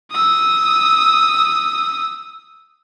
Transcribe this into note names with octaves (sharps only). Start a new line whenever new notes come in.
D#6 E6